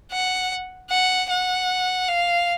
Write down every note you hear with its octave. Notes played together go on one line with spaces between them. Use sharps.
F#5
F#5
F#5
F5